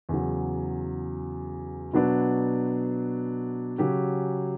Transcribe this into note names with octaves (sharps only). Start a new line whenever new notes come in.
E2 C#3 F#3
B2 F#3 B3 D4
C#3 F#3 C#4 G4